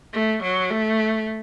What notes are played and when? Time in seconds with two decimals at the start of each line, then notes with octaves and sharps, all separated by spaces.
0.14 A3
0.43 F#3
0.71 A3